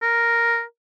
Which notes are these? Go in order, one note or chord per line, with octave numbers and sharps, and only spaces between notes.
A#4